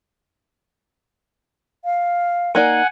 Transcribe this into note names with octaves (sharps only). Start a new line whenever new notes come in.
F5
A#3 D#4 D5 F#5 G#5